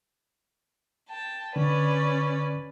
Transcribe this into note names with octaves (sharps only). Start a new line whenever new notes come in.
G5 A5
D3 C#4 B4 D5